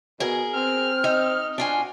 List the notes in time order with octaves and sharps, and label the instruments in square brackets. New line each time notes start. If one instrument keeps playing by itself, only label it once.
[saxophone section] B2 [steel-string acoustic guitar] G#4 A#4
[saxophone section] C4 [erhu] F6
[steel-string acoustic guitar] D#4
[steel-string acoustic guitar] D4 F4 G#5 [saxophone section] F#4